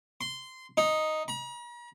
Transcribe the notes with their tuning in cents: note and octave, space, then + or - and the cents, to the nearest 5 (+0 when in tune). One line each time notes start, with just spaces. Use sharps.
C6 -15
D#4 +0
A#5 +45